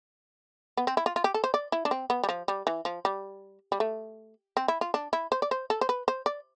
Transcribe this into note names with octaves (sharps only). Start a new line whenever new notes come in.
B3
C4
E4
F4
F4
G4
A4
C5
D5
E4
D4
C4
B3
G3
F3
G3
E3
F3
G3
G3
A3
C4
E4
F4
D4
E4
C5
D5
C5
A4
C5
B4
C5
D5